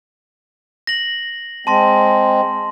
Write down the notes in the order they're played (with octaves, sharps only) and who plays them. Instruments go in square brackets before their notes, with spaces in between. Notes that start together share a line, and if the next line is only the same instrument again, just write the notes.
[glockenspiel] A#6 F#7
[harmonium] G#3 C4 [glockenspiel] A5 C6 A#6